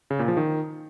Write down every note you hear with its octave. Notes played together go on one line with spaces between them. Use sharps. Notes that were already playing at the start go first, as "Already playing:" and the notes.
C#3
A#2
F3
D#3